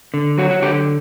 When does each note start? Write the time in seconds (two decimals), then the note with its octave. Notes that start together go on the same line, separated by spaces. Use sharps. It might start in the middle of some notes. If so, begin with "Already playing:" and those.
0.14 D3
0.38 F#3 F#4
0.51 F#4
0.62 D3 G4